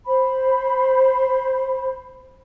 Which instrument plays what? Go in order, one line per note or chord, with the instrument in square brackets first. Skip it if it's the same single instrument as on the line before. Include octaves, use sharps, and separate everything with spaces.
[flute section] C5 B5